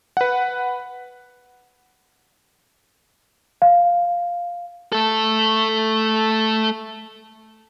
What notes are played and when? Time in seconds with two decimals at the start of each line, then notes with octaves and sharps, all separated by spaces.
0.17 B4 F#5
3.62 F5
4.92 A3 A4